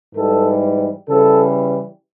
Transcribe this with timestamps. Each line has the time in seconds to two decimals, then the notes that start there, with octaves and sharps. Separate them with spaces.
0.15 G#2 E3 G3 A4
1.07 C#3 E3 G3 A4